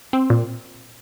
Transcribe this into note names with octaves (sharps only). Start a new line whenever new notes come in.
C4
A#2